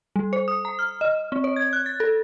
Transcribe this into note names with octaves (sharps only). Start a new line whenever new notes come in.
G3
C5
D#6
A#5
F6
D#5
C4
C#5
G#6
F#6
A6
A4